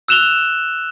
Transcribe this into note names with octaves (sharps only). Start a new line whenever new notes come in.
E6 F#6 E7 F7 G7